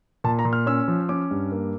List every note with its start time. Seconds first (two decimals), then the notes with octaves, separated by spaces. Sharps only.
0.24 A#2 A5
0.39 A#5
0.45 A#2
0.53 F6
0.66 C#4 E6
0.88 F3
1.09 C#4 D6
1.31 G2
1.52 A#3